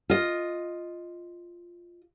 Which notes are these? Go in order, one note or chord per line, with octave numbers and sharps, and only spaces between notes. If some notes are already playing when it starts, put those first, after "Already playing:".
F4 D#5